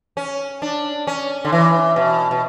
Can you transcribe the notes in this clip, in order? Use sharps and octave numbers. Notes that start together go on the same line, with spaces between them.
C#4
D4
C#4
D3
E3
B2
B2